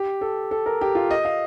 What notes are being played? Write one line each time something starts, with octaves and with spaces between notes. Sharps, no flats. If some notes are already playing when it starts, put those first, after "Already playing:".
Already playing: G4
A4
A4
A#4
G4
F4
D#5
F5